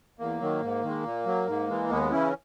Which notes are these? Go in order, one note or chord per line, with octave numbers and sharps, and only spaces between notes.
E2 A#3
D#3 F#3
G#2
D#3 G#3
A#2
F#3
G#2
E3 G#3
D#2 G#3 B3
C#3 E3 C#4 E4